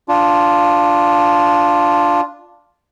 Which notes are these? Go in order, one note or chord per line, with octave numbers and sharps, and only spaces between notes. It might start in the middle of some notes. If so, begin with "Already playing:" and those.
D4 F4